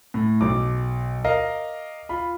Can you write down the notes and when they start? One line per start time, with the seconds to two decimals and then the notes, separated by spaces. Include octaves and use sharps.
0.14 A2
0.41 B1 D6
1.24 A#4 D#5 F5
2.09 F4 B5